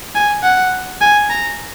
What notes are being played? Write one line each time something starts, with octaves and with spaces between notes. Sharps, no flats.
G#5
F#5
G#5
A#5